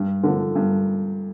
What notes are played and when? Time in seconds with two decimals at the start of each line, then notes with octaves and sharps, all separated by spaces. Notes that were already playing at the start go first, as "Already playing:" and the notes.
Already playing: G2
0.23 D3 F3
0.55 G2